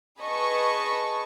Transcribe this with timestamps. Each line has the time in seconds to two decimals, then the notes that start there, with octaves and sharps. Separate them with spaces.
0.19 G#4 B4 D#5 A5 C#6